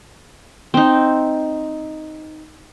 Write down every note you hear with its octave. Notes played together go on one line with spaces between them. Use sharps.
C4 D#4